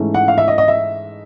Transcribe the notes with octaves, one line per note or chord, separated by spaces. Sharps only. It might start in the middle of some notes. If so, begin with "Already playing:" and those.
Already playing: G#2 E3 A3 C#4
F#5
F5
E5
D#5
D#5
E5